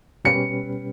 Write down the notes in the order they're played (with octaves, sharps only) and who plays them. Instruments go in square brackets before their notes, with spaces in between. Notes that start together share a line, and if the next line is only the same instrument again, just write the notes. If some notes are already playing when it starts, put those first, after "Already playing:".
[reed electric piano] B2 G3 C#4 G4 B4 [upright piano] C#7